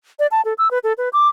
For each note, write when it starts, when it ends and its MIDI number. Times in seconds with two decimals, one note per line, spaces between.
0.19 0.27 74
0.31 0.41 81
0.45 0.53 69
0.58 0.70 88
0.71 0.79 71
0.84 0.93 69
0.98 1.09 71
1.13 1.28 86